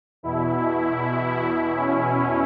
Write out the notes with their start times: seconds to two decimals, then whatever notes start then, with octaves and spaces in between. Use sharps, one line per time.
0.23 E2 B2 E4
1.76 C#4
2.07 C#4